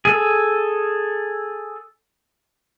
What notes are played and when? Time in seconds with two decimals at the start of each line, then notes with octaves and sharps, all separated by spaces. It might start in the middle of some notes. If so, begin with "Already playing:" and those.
0.05 G#4 A4